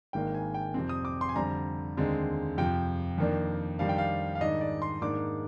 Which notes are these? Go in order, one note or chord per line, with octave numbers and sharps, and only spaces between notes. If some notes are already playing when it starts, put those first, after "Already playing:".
G#1 G#2 D#3 A#3 D4 G5
G#5
G5
F2 C3 F3 C4
D#6
D6
C6
G#5
F2 D3 G3 C4 A#5
D#2 D3 G#3 C4
F2 C3 F3 G5
F2 D#3 A#3 D4
F2 D#3 G3 D4 F5
G5
F5
F5
G#2 D#3 G3 D4 D#5
D5
C6
G#2 D#3 A#3 D4 D6